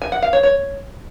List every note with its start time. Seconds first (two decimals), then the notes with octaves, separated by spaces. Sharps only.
0.02 G#5
0.12 F#5
0.22 F5
0.33 C#5
0.43 C#5